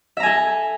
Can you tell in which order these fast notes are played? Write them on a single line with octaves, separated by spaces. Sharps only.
E5 A#5 G#5 A4